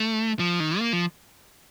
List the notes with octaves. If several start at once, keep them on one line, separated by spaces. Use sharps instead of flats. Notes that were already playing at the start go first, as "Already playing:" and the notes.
Already playing: A3
F3
D#3
A#3
F3